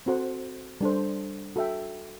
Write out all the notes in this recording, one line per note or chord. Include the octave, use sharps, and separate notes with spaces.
C4 F#4 A4 C5 F#5
G3 D4 A4 C5
F#4 A4 E5 G5